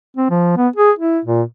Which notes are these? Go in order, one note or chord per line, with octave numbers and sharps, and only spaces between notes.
C4
F3
B3
G#4
E4
A#2